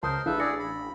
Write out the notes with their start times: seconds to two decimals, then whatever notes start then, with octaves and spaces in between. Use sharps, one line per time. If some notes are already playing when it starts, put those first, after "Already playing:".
0.03 C#2 A#4 C5 A5 C6 D#6 G6
0.26 A1 D4 E4 G#4 A4 B4 E5 F5
0.40 G#4 D5 E6 A#6 C#7
0.59 B5